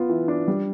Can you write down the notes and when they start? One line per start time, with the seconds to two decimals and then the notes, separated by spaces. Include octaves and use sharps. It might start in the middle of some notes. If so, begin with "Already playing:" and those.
Already playing: B3 F4
0.09 E3
0.28 D4
0.48 G3